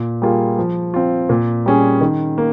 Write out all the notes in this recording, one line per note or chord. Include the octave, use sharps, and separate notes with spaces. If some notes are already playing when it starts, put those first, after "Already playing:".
Already playing: A#2
G3 A#3 F4 G#4
F3
C4 F4
A#2
G3 C#4 G#4
D#3
A#3